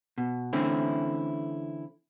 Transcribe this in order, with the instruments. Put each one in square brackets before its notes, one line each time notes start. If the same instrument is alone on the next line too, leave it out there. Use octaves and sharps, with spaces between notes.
[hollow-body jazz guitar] B2
D3 E3 A3 C4 C#4 E4